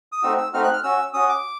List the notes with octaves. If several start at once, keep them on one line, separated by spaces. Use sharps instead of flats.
D#6
A3 C4 D#4 F#4 E6
E6
A3 C4 D#4 F#4 F6
F#6
F6
C#4 F#4 E6
C#4 F#4 D#6
D6